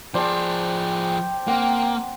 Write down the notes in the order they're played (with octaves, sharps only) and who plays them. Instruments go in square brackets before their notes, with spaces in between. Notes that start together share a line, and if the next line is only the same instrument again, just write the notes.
[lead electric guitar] F3 G#4 [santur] C5 D5 A5 [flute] G5
[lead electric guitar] A#3 [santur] C4 F#5